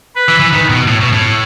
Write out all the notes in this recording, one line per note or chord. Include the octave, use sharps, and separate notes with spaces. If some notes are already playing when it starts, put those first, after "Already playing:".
B4
E3
E3
D#3
B2
A2
B2
A2